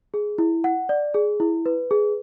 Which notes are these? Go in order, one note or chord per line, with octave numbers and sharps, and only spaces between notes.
G#4
E4
F#5
D5
G#4
E4
B4
G#4